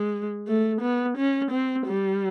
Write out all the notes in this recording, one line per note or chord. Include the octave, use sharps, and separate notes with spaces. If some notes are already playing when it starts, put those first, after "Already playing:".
Already playing: G#3
A3
B3
C#4
C4
G3